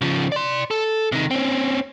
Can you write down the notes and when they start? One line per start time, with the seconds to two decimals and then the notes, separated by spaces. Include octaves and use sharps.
0.01 C#3 F3
0.32 D5 C6
0.71 A4
1.12 C3 D#3
1.31 C4 C#4